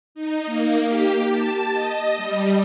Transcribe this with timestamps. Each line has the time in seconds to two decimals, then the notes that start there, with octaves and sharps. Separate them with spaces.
0.15 D#4
0.46 A#3
0.85 G4
1.29 A5
1.72 D#5
2.17 G3